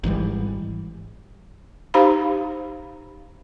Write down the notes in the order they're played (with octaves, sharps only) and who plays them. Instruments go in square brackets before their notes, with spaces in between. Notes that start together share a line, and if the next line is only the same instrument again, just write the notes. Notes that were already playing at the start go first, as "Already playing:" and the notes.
[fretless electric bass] G#1 G#2 E3 G3
[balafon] D#4 G4 C5 F5 A#5 B5